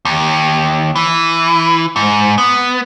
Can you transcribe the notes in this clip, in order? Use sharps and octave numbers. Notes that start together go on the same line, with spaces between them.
D#2
E3
G#2
B3